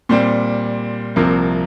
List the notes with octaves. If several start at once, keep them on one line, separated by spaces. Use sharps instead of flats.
A#2 G3 C4
C2 C3 F3 A#3